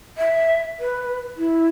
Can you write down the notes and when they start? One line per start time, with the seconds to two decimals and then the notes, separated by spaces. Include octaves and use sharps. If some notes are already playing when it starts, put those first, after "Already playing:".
0.17 E5
0.79 B4
1.37 E4